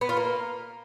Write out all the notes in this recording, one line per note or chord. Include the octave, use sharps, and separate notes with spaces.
B3
F4
A#3